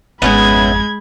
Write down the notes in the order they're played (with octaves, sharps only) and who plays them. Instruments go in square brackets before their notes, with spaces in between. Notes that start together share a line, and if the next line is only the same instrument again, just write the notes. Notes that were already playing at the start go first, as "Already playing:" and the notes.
[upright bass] G#1 F2 [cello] G#3 [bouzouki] B3 C#4 E4 [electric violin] B5 G#6